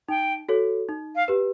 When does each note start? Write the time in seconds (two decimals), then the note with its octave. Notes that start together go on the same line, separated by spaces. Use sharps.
0.09 D#4 G5
0.49 F#4 A4 C#5
0.89 D#4
1.16 F5
1.28 G4 B4